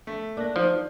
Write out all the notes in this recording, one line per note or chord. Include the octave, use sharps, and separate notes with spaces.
A3
A#3 D4 F#6 A#6
F3 D#4